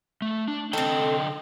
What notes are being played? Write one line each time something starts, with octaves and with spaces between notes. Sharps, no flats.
A3
D4
D3 C4 A4 D#5 G5